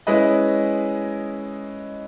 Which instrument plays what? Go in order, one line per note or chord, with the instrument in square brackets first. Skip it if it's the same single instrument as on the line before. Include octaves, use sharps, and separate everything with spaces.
[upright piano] G#3 C#4 E4 B4 D#5